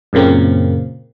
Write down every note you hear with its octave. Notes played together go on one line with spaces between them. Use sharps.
F#2 A#2 C#3 A#3 C4